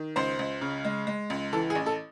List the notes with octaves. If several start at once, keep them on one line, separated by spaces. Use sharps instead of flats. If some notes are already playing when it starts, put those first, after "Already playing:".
Already playing: D#3
C#2 C5
C#2
C#3
G#3
G#3
C#2
E3 A4
G#4
A1
A4